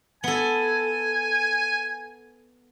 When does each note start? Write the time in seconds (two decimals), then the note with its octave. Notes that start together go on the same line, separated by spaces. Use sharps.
0.24 B3 A4 G#5